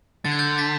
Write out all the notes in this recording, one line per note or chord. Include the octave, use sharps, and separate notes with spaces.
D3 A6
G#6
G6 A6
A6 B6